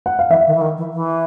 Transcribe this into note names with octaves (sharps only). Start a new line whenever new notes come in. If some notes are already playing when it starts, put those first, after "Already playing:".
F#5
F5
E3 E5
D#3
E3
D#3
E3
E3